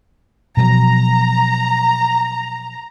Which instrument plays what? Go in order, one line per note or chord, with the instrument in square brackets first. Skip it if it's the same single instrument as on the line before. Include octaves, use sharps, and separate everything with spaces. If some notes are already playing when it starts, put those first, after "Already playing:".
[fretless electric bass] B2 F3 F#3 [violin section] A#5